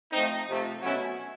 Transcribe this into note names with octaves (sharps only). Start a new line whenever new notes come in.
F3 A3 C4 D#4
C3 F3 A3
B2 F#3 A3 C#4 E4